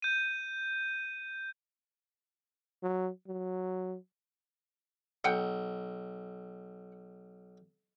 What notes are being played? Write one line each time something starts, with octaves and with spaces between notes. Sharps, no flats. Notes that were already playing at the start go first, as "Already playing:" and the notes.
G6 D#7
F#3
F#3
B1 F#5 G5